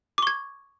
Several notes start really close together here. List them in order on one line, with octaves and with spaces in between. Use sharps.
D6 C#6 G#6